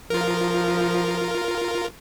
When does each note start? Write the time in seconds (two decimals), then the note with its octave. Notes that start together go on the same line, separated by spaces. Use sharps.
0.10 F3 F4 A#4